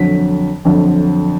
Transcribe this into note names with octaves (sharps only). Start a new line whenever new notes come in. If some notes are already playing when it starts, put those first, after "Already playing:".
Already playing: F2 D3 F#3 B6
F2 D3 F#3